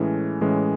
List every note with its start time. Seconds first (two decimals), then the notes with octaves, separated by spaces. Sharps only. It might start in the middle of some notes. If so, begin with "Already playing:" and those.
Already playing: A2 E3 G#3 C#4
0.41 A2 E3 G#3 C#4